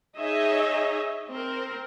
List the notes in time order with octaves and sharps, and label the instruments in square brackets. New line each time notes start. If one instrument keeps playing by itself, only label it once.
[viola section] D#4 G#4 C#5 D#5 E5
C4 A#4